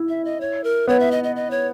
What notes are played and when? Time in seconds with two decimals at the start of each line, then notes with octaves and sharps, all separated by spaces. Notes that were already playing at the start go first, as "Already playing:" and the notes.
Already playing: E4
0.09 E5
0.25 D#5
0.41 C#5
0.64 A#4
0.88 B3 C#5
1.00 E5
1.11 D#5
1.24 D#5
1.36 D#5
1.51 C#5